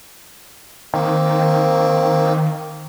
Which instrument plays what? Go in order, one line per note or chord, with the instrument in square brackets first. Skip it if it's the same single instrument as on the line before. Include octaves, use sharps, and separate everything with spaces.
[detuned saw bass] D#3 [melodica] A#3 C4